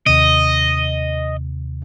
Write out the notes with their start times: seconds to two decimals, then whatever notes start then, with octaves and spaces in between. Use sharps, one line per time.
0.06 D#2 C3 D#5